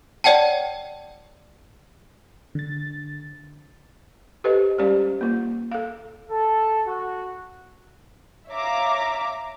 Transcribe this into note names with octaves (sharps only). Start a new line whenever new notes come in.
C#5 D5 F#5 G5 A5
D3 A6
G4 A4 B4 C5 D#5
G3 G#3 C#4 G4 C5 D5
A#3 F4
A4 F5
A4
F#4
C#5 E5 F5 A#5 D6